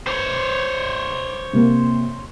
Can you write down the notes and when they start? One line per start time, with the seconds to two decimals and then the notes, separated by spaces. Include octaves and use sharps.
0.07 C5 C#5
1.53 C3 A#3